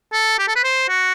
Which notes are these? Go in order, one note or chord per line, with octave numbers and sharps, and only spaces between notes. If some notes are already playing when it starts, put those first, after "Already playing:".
A4
G4
A4
B4
C5
F#4